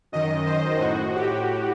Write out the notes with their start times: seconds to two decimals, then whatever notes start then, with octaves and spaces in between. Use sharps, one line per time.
0.12 F#2 D#3 D#5
0.46 C5
0.80 A2 F#4
1.15 G4